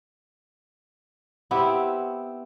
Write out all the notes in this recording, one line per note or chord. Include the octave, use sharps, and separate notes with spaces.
B3 C4 E4 G4